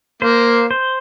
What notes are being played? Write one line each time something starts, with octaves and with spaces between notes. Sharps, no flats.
A#3 C5
C5